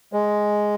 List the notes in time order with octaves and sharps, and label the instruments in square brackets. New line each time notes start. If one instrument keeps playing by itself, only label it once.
[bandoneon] G#3